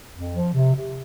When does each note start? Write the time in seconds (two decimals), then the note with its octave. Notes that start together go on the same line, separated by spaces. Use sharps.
0.13 F2
0.34 F3
0.54 C3
0.75 C3